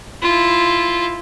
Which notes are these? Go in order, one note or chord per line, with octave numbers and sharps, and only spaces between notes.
E4 F4